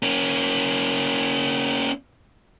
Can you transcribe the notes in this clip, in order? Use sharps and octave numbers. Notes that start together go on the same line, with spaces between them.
A#3 C#4